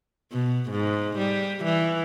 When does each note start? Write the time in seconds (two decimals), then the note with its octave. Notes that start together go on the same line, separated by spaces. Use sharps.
0.33 B2
0.71 G#2
1.19 G3
1.64 E3